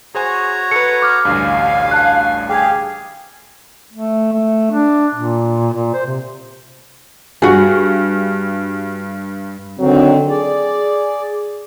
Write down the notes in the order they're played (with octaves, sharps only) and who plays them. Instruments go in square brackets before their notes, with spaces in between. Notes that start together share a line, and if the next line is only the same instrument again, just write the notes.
[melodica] F#4 C#5 A#5 [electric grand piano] G#4 C5 G#5
[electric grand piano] A4 B4 [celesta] C#7
[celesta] D6 F6
[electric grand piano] A1 D2 G2 [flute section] F5 [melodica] G#5
[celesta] A5 F#6
[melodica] G4 F5 [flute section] G#4 [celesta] G5
[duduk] A3
A3
D4
A#2
A#2
C5
C3
[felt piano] G2 [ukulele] F#4 G#4
[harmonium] D3 D#3 C4 [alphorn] F#3
[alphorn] G#4 [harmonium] D5